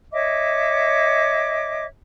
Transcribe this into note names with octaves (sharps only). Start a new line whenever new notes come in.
C#5 D#5 E5 D6